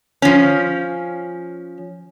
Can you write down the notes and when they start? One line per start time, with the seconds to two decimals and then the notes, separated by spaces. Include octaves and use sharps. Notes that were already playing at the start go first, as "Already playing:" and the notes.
0.22 F3 C#4